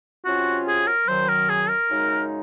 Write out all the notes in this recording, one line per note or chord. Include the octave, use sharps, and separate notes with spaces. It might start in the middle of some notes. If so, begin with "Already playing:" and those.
C3 F#3 C#4 F4 F#4
G#4
A#4
F#2 D#3 F#3 C5
A#4
G#4
A#4
F#2 C#3 G#3 D#4